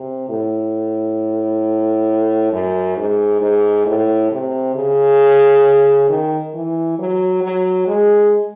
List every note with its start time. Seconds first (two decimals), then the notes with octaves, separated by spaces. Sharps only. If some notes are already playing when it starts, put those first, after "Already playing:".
Already playing: C3
0.29 A2
2.52 F#2
2.97 G#2
3.41 G#2
3.86 A2
4.31 C3
4.75 C#3
6.09 D#3
6.54 E3
6.98 F#3
7.43 F#3
7.87 G#3